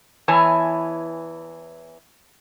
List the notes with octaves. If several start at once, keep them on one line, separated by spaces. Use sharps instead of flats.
E2 E3 C#5 G#5 A5